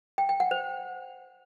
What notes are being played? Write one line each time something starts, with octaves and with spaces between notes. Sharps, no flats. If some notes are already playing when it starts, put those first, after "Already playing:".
G5
G5
F#5
C5